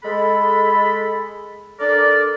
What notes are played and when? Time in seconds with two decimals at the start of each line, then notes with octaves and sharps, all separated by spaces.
0.04 G#3 A4 B5
1.80 D4 A4 A#4 D5